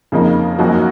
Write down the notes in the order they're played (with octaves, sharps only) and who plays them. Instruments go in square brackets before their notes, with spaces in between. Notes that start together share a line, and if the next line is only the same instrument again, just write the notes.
[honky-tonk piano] F2 C#3 F3 A#3 D#4
F#2 F3 A#3 D#4 F#4